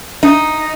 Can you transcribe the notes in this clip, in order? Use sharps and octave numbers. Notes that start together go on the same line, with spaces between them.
D#4